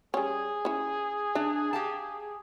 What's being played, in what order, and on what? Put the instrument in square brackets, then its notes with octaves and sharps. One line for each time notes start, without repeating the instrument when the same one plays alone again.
[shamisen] G3 C#4 [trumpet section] G#4
[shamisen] C#4 E4
[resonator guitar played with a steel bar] D4 [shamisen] E5
[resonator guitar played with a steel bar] G4 F5 A5